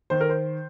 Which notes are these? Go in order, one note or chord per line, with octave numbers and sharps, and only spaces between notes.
D#3 C5
A#4
C5